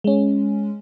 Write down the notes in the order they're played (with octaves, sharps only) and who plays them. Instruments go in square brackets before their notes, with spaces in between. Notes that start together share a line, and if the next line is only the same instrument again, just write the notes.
[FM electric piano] G#3 C#4